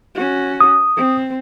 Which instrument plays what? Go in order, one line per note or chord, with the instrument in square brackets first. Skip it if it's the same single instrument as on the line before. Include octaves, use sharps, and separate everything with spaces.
[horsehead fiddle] C#4 F#4
[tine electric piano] D#6
[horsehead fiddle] C4